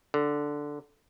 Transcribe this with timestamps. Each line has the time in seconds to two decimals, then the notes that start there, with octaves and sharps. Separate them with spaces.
0.14 D3